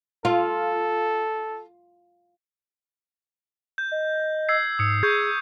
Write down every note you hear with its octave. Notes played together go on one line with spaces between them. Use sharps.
F4 A4
G6
D#5
E6 G#6 C7
G#2 D#6 C#7
G#4 C#6 G6 G#6